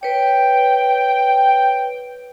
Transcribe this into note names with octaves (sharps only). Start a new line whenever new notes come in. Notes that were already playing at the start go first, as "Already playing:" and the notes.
B4 C#5 G5